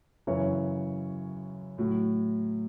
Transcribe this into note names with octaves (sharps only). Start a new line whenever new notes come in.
F#2 C#3 E3 C#5
A2 F#3